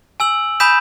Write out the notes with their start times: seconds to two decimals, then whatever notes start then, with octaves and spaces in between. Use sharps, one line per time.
0.20 G#5 E6 F#7
0.60 G#5 B5 D#6 G6 B6 E7